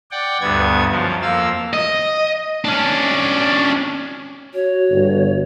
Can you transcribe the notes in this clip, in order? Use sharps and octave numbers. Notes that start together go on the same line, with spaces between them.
D5 F#5 G5
D2 G2 B3 G#6
F#2 F3
F2 A#3 F5 E6
D#5
C#4 D4
F#4 C#5
G1